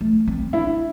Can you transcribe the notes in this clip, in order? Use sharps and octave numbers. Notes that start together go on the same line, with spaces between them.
A3
C4
D4 E4